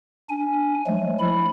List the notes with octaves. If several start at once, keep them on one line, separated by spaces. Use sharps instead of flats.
D4 G#5
F3 F#3 G#3 A3
F3 E4 B5